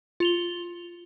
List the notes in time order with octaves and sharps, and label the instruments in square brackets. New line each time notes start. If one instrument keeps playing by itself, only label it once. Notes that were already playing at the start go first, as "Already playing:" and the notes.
[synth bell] F4 F7 G7